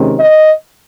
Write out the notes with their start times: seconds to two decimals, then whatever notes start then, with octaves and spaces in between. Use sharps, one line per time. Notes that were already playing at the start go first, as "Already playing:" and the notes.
Already playing: C3 D#3 G#3 C#4
0.19 D#5